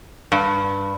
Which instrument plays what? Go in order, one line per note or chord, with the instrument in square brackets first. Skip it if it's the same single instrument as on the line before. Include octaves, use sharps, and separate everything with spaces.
[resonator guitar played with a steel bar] G2